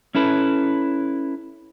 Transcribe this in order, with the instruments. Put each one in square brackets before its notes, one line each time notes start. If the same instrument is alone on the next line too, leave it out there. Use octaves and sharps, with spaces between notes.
[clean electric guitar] C#4 E4 A4 B4